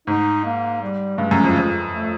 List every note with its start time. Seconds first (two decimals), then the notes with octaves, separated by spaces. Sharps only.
0.07 G#2 D#4
0.45 A#3
0.82 G3
1.18 G2 G#3
1.31 F#2
1.44 F2
1.56 F2
1.93 A3